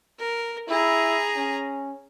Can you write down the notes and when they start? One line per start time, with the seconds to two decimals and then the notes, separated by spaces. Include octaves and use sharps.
0.19 A#4
0.68 E4 G#4 A#5
1.36 C#4